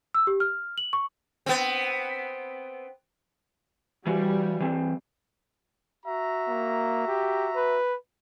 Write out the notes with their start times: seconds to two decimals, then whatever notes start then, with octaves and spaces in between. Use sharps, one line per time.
0.14 E6
0.27 G4
0.40 F6
0.78 F#7
0.93 C#6
1.46 B3 C4
4.07 E3 G3 F#4
4.60 E3 C4
6.06 F#4 E5 A#5
6.49 A#3
7.08 G4
7.56 B4